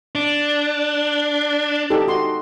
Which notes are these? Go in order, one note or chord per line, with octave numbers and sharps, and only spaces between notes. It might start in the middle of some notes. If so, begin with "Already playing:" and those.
D4
D#4 G4 A4
F#4 C6